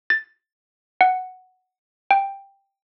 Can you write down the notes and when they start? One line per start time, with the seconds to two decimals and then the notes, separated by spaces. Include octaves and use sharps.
0.10 A6
1.01 F#5
2.11 G5